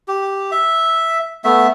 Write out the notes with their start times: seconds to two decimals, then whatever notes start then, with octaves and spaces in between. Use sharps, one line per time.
0.08 G4
0.52 E5
1.44 A3 B3 E5